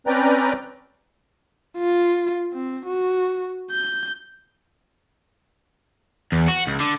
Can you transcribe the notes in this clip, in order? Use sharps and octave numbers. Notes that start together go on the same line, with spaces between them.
C4 C#4 B4 D5 G5 A#5
F4
C4
F#4
G6
E2
F#4
C#2
D3